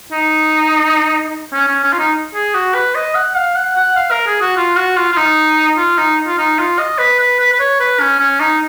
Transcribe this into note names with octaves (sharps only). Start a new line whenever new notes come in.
D#4
C#4
C#4
C#4
F4
D#4
G#4
F#4
B4
D#5
F#5
F5
F#5
F#5
F5
A#4
G#4
F#4
F4
F#4
F4
F4
D#4
F4
D#4
F4
D#4
F4
D#5
B4
B4
B4
B4
C#5
B4
C#4
C#4
D#4